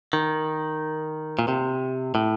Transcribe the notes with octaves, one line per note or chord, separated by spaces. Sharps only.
D#3
A#2
C3
A2